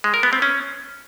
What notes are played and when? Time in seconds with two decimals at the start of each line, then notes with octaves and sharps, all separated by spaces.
0.04 G#3
0.14 A#4
0.23 B3
0.33 C4
0.42 C#4